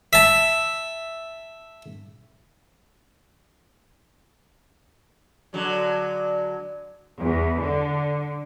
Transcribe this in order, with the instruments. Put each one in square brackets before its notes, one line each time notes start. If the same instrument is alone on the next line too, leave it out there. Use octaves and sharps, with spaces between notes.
[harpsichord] E5 A5
[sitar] D3 F#3 G#3
[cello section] E2
D3